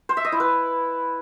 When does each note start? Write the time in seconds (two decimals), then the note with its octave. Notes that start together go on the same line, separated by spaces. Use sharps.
0.09 C5
0.17 E5
0.25 D#5
0.32 E4
0.40 B4